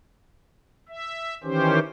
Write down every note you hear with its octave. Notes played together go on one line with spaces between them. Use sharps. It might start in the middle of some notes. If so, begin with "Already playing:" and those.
E5
D#3 E3 C#4 G4 C5